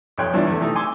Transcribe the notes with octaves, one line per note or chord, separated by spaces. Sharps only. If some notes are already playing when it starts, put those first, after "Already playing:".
B1 F2 C#5 G5 C6 F#6
E2 G2 E3 F3 D4 D5
E2 A3
C3 E3 A3 D#4
G#5 C6 D6 E6